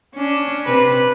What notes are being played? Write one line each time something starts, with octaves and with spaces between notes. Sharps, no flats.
C#4 D4
C3 B4